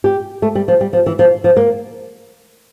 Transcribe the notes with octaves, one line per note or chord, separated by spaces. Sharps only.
G4
A3
G3
F3
G3
F3
E3
F3
F3
A#3